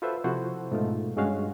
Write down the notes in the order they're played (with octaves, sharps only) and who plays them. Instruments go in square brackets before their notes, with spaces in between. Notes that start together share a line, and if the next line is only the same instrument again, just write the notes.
[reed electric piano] F4 F#4 A4 B4 C5 E5
C3 F3 E4 F#4 A4 C5
G#2 B2 A3 D#4 F4
G2 G#3 C#4 F#4 F5